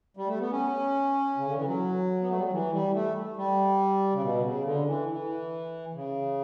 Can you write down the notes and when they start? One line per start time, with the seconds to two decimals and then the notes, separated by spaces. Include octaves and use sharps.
0.17 G3
0.27 A3
0.40 B3
0.51 C#4
1.37 C#3
1.46 D3
1.56 E3
1.66 F#3
2.22 B3
2.29 A3
2.36 G3
2.44 F#3
2.52 E3
2.72 G3
2.94 A3
3.36 G3
4.13 C#3
4.22 B2
4.44 C#3
4.65 D3
4.87 E3
5.08 E3
5.94 C#3